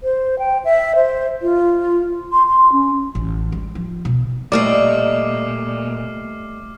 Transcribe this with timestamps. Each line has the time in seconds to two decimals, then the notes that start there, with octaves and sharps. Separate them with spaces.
0.03 C5
0.39 G5
0.65 E5
0.96 C5
1.42 F4
2.32 C6
2.47 C6
2.72 C#4
3.15 A1
3.52 G3
3.75 F3
4.05 B2
4.52 A#2 G3 A3 D5 D#5 D6 F6 C7